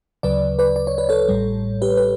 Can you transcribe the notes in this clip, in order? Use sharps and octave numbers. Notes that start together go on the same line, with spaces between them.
D2 C#3 F#3 B4 D5
B4 D5
D5
C#5
B4
A4 C#5
A1 A2 G3
G4 B4
B4